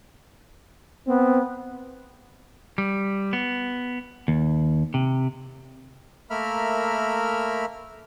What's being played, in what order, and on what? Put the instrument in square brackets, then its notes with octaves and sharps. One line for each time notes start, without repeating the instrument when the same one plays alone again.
[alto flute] B3 [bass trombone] C4
[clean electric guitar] G3
B3
D#2
C3
[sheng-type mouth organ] A3 A#3 A#4 E5 B5 F6